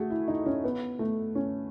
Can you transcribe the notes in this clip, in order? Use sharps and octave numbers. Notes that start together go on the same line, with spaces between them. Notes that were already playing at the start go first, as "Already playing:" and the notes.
Already playing: A3 F#4 G#4
E4
D#4
C#4
B3
A3
C#4